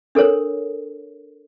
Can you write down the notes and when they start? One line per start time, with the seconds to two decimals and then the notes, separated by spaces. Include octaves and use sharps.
0.15 D4 A4 A#4 C#5